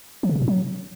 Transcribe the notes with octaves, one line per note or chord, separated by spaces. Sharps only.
F3
C#3
C3
A2
F#3